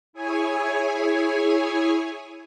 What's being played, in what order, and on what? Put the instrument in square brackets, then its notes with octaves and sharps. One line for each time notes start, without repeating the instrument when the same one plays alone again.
[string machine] E4 G#4 C#5 G#5